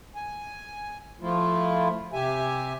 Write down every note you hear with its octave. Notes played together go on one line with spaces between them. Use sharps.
G#5
F3 A3 E4 F4
C3 G4 E5 G#5